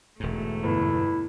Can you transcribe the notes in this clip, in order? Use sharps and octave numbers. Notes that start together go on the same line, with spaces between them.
E1 G#2 A3
G1 E4